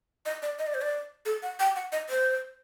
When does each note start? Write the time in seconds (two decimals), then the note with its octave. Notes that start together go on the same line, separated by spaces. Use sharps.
0.26 D#5
0.42 D5
0.59 D#5
0.67 D5
0.74 C5
0.81 D5
1.26 A4
1.43 F#5
1.60 G5
1.76 F#5
1.92 D#5
2.09 C5